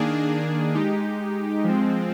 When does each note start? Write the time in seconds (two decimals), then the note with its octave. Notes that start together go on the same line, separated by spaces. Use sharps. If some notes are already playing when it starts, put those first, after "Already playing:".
Already playing: D#3 A#3 D4 G#4
0.74 G#3 D#4 G4
1.64 F3 G#3 C4